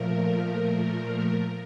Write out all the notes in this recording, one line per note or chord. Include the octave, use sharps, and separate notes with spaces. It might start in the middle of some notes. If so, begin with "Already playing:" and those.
Already playing: A#2 F3 A3 A#4